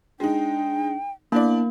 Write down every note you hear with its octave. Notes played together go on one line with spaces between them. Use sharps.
G#3 D4 D#4 G5
A#3 B3 D4 E4 D5